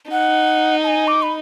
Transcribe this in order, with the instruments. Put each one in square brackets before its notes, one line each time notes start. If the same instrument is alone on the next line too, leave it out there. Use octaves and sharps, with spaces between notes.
[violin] D#4 [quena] F#5
[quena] A5
G#5
D6
B5